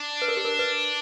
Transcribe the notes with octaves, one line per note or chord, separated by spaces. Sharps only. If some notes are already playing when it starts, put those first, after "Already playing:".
Already playing: D4
B4
A#4
G4
A#4
B4